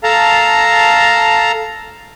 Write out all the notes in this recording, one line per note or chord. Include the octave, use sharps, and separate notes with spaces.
A4 F5 A5 A#5